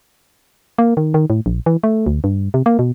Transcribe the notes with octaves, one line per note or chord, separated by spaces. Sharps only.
A#3
D#3
D#3
A2
A#1
E3
A3
D2
G2
C3
A#3
B2